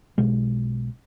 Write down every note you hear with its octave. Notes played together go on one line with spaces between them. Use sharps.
B1 B2 G#3